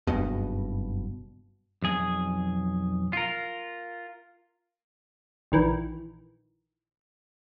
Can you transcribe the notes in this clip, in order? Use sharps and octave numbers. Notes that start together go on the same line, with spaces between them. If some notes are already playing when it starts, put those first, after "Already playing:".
F#1 G2 B2
B1 F2 G#4
F4 A#4
A#1 D#3 E3